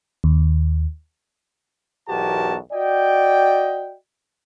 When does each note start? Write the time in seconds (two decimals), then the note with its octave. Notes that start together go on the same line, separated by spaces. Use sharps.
0.24 D#2
2.08 B1 E2 F#4 G4 A#4 A5
2.72 F#4 D5 D#5 G5